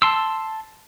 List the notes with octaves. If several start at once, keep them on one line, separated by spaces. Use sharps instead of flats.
A5 C6 E6